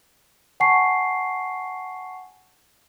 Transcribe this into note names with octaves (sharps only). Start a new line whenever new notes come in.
F#5 G#5 A5 C#6 C7